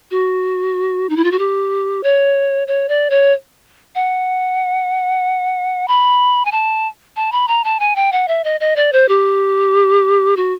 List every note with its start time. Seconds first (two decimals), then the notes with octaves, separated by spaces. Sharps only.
0.11 F#4
1.09 D#4
1.16 E4
1.24 F4
1.31 F#4
1.39 G4
2.03 C#5
2.68 C#5
2.89 D5
3.10 C#5
3.95 F#5
5.88 B5
6.45 G#5
6.52 A5
7.16 A5
7.32 B5
7.48 A#5
7.64 A5
7.80 G#5
7.96 G5
8.12 F#5
8.28 E5
8.44 D#5
8.60 D#5
8.76 D5
8.93 C5
9.09 G4
10.37 F#4